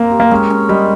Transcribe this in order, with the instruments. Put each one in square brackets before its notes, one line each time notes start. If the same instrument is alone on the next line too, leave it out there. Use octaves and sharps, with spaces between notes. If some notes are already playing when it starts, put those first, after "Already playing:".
Already playing: [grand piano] A#3 [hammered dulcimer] C4 A#4
[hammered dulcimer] G4
[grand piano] A#3
[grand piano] G#3 [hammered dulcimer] C#4
[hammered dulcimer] C#4
[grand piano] G3 [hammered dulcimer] G#3